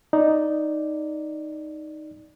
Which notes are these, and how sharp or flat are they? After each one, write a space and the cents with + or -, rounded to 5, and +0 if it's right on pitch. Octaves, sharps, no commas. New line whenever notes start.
D#4 +0 D5 +0